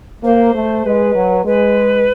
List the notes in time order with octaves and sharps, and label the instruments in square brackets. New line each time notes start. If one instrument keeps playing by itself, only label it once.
[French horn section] A#3 [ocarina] C5
[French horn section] A3
[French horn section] G#3 [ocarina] B4
[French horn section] F#3
[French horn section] G#3 [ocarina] B4